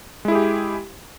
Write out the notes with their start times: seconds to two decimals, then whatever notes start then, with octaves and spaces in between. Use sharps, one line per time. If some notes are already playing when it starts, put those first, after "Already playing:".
0.25 G#3
0.28 E4
0.32 G#4
0.35 G4